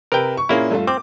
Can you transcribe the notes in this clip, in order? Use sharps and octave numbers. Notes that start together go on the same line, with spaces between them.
C3 A#4 B4 G5
C#6
A#2 A#3 C#4 E4 G#4
G2 A3 F4
C4 D6